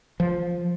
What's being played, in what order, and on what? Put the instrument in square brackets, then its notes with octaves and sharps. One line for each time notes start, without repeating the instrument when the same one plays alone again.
[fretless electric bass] F3